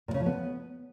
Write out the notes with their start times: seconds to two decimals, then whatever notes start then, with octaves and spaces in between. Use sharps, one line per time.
0.08 A#2
0.14 C#3
0.20 F3
0.26 B3